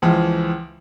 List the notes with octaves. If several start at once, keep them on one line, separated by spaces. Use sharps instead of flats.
C#2 E3 F3